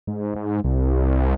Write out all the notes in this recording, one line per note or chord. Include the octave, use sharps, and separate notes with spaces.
G#2
G#2
C2